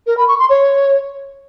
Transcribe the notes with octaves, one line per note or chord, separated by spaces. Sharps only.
A#4
B5
C#6
C6
C#5